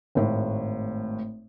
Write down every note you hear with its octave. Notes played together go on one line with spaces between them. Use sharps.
G#1 A2 G#3